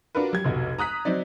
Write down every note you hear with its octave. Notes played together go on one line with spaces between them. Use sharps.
D4 F4 F#4 A#4 B4
F#3 G4 G#6
F1 B1 F#4
A#5 D#6 F#6 B6
F#3 C4 D#4 D5